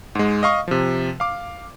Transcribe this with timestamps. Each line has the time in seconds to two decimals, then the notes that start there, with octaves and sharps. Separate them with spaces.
0.15 G#2 G#3
0.43 D#5 F5 C#6 D#6
0.68 C3 F3
1.20 F5 D6